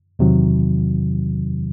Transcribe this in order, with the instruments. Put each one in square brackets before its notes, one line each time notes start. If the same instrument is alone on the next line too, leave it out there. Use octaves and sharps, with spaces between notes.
[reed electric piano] E2 C3 D#3 F#3